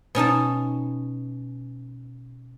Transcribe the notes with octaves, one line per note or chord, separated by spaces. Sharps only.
B2 C#4 D#4 A5